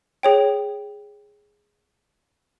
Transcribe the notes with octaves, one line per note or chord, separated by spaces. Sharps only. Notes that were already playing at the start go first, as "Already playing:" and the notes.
G#4 C#5 G5